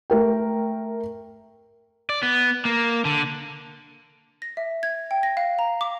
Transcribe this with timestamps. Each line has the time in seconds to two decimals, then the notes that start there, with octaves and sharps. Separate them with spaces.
0.10 A3 A#4 G5
2.09 D5
2.23 B3
2.65 A#3
3.05 D3
4.42 A#6
4.57 E5
4.83 G#6
5.11 G5
5.23 A#6
5.37 F5
5.59 A#5
5.81 D6